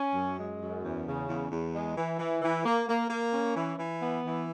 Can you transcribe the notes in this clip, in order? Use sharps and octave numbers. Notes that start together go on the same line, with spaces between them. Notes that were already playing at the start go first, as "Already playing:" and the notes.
Already playing: C#4
F#2
G#3
F#2
E2
C#3
E2
E2
G#3
E3
E3
E3
A#3
A#3
A#3
C#4
E3
E3
B3
E3